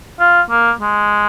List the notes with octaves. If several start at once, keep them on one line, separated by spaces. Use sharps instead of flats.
F4
A#3
G#3